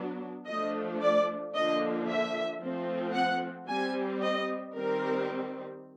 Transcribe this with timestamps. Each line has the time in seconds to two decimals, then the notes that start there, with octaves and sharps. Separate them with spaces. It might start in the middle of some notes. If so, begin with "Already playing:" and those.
Already playing: F#3 B3 D4
0.48 F3 A3 D4 D#5
1.02 D5
1.54 D3 F3 A#3 D4 D#5
2.08 E5
2.61 F3 A3 C4
3.14 F#5
3.68 G3 C4 G#5
4.22 D#5
4.75 D#3 G3 C4 A#4